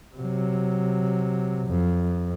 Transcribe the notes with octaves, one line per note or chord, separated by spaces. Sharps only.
C3 F#3
F2